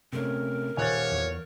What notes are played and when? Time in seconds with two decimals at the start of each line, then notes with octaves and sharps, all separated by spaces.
0.13 C3 A3 C#4 A#4
0.77 D#1 C#5 G#5 F#6 A6
1.11 E2